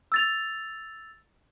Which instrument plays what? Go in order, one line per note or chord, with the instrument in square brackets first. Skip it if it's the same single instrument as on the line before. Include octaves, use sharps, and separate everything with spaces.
[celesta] E6 A6 F7